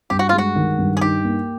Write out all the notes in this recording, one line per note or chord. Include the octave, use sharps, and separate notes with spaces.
G2 G4
F#4
G#3 F4
F#4
D#3
G2
G#4
D#4 G4
A#3